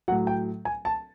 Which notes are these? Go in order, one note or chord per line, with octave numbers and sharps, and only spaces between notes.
A2 F#3 F#5
G5
G#5
A5